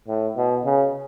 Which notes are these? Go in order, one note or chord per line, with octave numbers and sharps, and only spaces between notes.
A2
B2
C#3